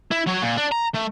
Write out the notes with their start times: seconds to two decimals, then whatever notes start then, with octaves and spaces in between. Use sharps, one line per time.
0.11 E4
0.26 F#3 C#5
0.42 A#2
0.57 D4
0.72 A#5
0.94 A3